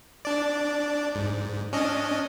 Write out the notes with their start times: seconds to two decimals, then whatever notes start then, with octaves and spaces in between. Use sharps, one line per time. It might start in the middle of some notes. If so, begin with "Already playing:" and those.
0.25 D4 D5
1.15 G#2
1.73 C#4 D4 D#5